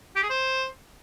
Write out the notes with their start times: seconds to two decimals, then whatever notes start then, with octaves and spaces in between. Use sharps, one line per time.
0.16 G4
0.23 G#4
0.30 C5